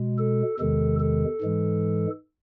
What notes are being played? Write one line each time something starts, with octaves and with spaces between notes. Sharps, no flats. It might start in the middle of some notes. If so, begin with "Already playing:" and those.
Already playing: B2 G#3
A4
E2 C3 D#3 G#3 A4
A4
G#2 E3 G#3